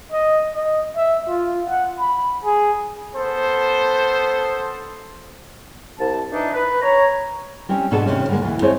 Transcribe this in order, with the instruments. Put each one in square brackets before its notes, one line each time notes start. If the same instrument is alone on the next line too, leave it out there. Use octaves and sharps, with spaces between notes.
[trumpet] D#5
D#5
E5
F4
F#5
B5
G#4
[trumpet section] B3 A4 C5
[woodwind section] C2 A5
E3 D4 D#4
B4
C#5 A#5
[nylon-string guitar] G3 C4 C#4
G#2 B2 D4 G#4 A4 A5
D#2 C3 C#4
D3 F3 G3 G#3 A#3
D2 E3
G#3 A3 C4 G#4 C5 C#5